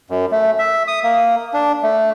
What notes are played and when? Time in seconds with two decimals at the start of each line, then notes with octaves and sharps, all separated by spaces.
0.10 F#2
0.31 A3
0.58 E5
0.88 D#6
1.03 A#3
1.54 D4
1.83 A3